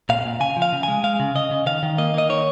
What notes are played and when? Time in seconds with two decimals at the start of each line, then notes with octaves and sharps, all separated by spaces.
0.09 A#2 F5
0.25 A#2
0.40 C#3 G#5
0.56 F3
0.62 F5
0.73 C#3
0.83 G#3 G#5
1.04 G#3 F5
1.20 C#3
1.35 C#3 D#5
1.51 C#3
1.67 D#3 F5
1.83 D#3
1.98 A#3 D#5
2.14 A#3 D#5
2.30 D#3 C#5